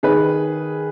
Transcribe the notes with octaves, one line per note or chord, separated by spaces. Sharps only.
D#3 G#4 B4